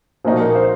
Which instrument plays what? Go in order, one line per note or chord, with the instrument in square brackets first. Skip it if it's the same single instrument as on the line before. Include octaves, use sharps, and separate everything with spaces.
[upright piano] A#2 F3 A#3 D#4 F#4 [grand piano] C5
[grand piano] A#4
C5